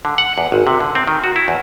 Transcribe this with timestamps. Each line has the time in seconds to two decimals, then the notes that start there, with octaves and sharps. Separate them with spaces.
0.05 D3
0.18 F#5
0.38 E2
0.52 G#1
0.67 C3
0.80 D3
0.95 C4
1.07 D#3
1.24 F#4
1.36 E4
1.48 E2